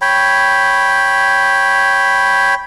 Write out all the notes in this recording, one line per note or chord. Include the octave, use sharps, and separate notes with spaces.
C#5 G5 B5